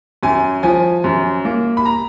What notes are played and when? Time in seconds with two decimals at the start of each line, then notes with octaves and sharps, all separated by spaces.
0.23 F#2 G#5
0.63 F3 G#5
1.04 F#2
1.45 A#3
1.77 B5
1.85 A#5